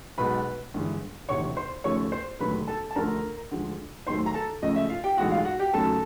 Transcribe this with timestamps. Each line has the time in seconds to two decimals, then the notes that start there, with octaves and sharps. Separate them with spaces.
0.18 B1 B2 G#3 B4 B5
0.74 G1 G2 E3 G#3
1.29 E1 D2 C3 E3 C#5 C#6
1.57 C5 C6
1.84 D#2 C#3 F3 A3 C#5 C#6
2.12 C5 C6
2.39 E1 D#2 D3 F#3 A3 B4 B5
2.67 A4 A5
2.91 A5
2.96 D2 D3 F3 A3 A#4 A#5
3.51 D2 D3 F3 G#3
4.07 D#2 D#3 F#3 A3 C5 C6
4.26 A#5
4.34 A4 A5
4.62 C#2 C#3 F3 A3 D#5
4.76 E5
4.90 F4 F5
5.04 G4 G5
5.17 B1 A2 E3 G#3 F#4 F#5
5.31 F4 F5
5.45 F#4 F#5
5.59 G4 G5
5.73 D#2 C#3 F#3 A3 A4 A5